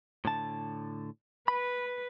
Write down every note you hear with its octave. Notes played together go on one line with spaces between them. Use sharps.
A2 D3 A5
B4 B5